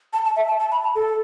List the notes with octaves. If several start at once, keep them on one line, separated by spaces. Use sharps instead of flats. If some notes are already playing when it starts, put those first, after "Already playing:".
A5
A5
E5
A5
A5
B5
A5
A4